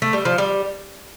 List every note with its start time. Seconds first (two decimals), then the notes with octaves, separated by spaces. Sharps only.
0.02 A3
0.13 G3
0.25 F3
0.38 G3